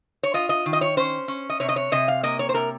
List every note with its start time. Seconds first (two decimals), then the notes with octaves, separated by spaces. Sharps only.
0.23 C#5
0.34 F4 D#5
0.49 D#5
0.66 D#3
0.73 D#5
0.81 C#5
0.97 C#4 C5
1.28 C#4
1.49 D#5
1.60 C3 C#5
1.69 D#5
1.76 C#5
1.92 C3 D#5
2.08 F5
2.23 A#3 D#5
2.39 C#5
2.49 C5
2.54 C3 A#4